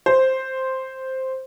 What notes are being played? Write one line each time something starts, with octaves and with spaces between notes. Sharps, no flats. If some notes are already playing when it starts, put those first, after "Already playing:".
C5